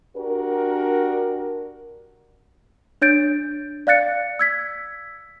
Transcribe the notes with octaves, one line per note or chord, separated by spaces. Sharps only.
D4 F#4 G4 A#4
D4 C#5 G6 A6 D7
D5 F5 F#6 A6 C#7
E6 G#6 B6